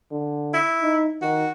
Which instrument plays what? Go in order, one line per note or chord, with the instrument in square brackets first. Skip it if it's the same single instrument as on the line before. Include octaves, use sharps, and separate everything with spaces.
[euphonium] D3
[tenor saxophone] E4
[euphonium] D#4
[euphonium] D#3 [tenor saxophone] F#4